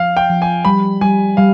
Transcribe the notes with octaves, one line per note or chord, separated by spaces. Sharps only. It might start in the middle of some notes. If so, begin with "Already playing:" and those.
Already playing: F3 F5
G5
F3
G#5
G3 B5
G3 G#5
G3 F5